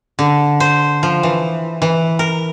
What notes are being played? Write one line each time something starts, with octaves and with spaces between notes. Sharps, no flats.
D3
C5
F3
E3
E3
A#4